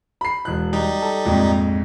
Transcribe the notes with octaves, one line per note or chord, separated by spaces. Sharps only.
B5 C7
E1 F#6
G3 D#4
A4
A#1 F2 G#2